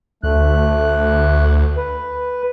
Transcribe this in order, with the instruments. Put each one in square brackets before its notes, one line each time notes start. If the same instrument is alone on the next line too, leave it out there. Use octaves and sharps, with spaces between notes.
[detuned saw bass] D2 [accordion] A3 F#6
[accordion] B4